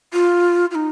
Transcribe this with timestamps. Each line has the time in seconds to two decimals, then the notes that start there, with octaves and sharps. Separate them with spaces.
0.13 F4
0.71 F4
0.75 D#4